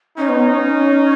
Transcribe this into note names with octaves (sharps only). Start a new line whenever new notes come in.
C#4 D#4
B3
C#4